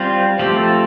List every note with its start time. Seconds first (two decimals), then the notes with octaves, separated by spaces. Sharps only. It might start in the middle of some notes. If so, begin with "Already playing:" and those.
Already playing: G3 C4 F4 C5
0.39 F3 A3 C4 G4
0.56 A4